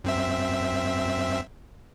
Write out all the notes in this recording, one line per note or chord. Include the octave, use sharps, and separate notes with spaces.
F#2 C4 E5